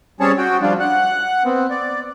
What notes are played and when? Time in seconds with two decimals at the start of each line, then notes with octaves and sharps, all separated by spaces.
0.20 G3 C4 C#4 G#4 C#5 A5
0.38 F#4 G5
0.62 F3 G3 D4 F4
0.80 F#5 F#6
1.45 B3 C4
1.70 D5